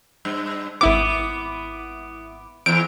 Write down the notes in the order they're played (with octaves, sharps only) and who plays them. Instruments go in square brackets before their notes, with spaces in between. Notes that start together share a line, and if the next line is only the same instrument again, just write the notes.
[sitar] G2
[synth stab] G#1 E4 D6 [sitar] B3
[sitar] E2 E3 [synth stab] D7